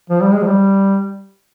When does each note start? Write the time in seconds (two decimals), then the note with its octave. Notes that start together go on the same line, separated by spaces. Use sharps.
0.10 F3
0.22 G3
0.33 G#3
0.42 F3
0.47 G3